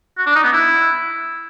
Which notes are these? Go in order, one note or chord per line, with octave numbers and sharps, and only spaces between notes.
F#4
D4
D#4
B3
E4